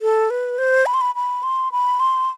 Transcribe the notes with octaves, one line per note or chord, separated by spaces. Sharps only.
A4
B4
C5
B5
C6
B5
B5
C6
B5
C6